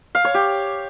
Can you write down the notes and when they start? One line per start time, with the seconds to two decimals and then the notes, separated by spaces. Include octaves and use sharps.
0.15 F5
0.25 C#5
0.34 G4